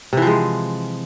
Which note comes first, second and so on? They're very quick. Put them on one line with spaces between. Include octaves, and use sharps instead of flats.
C3 E3 F3 G#3